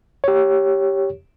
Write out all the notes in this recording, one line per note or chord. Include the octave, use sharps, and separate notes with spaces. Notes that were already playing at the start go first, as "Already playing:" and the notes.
G4 C#5